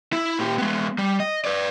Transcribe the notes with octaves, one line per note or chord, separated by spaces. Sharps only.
E4
A#2 G4
G#3 B3
G3
D#5
B4 D5